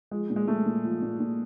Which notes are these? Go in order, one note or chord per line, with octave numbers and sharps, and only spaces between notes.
F3 G#3
A#2
G#3
A#2 A3
A#2
F3
A#2
A#2